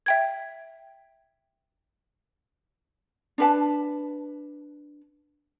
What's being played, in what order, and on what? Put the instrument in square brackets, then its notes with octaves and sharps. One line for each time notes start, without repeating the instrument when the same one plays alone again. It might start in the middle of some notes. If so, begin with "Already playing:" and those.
[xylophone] E5 G5 G#6
[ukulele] D4 B4 A5